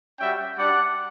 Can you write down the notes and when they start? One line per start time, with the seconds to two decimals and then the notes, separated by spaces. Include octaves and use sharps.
0.18 G3 C#4 F#4 E5 G5
0.57 G3 D4 G4 D5 F#5